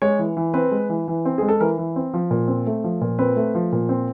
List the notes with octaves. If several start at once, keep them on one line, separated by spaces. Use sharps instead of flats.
G#3 C#5
E3
E3
C4 B4
G#3
E3
E3
C4
G#3 G#4
A4
E3 A#4
E3
C4
F3
A#2
C4
A3
F3
A#2
C4 B4
A3
F3
A#2
C4